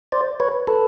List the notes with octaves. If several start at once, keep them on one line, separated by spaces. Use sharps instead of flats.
C5 D5
B4 C#5
A4 B4